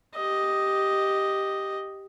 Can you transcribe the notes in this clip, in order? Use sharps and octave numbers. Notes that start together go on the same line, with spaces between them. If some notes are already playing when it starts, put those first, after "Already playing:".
G4 D#5